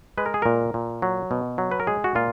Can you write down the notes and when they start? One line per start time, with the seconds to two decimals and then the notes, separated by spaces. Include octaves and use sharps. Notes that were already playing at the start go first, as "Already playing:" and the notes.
0.18 G#3 B4
0.26 A#4
0.34 G#4
0.42 A#2 A#4
0.74 A#2
1.02 F#3
1.31 B2
1.58 F#3
1.71 B4
1.80 A#4
1.87 G#3 G#4
2.04 F#4
2.15 A#2 F4